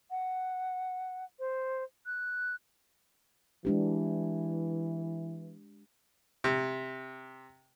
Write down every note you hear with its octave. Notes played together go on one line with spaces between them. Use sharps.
F#5
C5
F#6
E3 G#3 D4 G4
C3